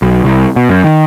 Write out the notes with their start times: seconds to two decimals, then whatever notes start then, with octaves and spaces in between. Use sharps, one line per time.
0.02 B1
0.24 C2
0.56 B2
0.70 F#2
0.84 D#3